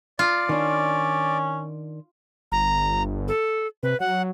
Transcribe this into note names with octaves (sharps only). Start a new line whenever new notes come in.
F4 D5
D#3 C#4 D4
G1 A#5
A4
C3 B4
F#3 F#5